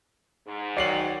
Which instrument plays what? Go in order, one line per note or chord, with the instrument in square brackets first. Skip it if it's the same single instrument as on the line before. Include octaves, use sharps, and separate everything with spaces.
[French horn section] G#2
[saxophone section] D#3 F#3 [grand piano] D5 C7 F#7